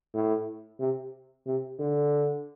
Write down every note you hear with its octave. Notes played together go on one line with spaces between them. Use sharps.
A2
C3
C3
D3